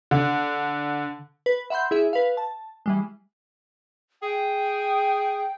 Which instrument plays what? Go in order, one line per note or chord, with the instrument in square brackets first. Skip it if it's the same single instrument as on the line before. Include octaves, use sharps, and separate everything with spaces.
[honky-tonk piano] D3
[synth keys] B4
E5 F#5 B5 C6 G6
E4 G#4 E5
B4 F5
A5
E3 G3 G#3
[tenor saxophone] G#4 [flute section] G5